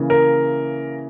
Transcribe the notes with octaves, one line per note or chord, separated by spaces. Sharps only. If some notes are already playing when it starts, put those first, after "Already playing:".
Already playing: C#3 E3 A#3
A#4